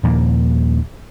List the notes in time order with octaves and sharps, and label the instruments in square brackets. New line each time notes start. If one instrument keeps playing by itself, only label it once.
[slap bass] D#2 A#2 F3 A#3